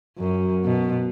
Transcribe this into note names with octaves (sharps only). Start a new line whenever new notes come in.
F#2
B2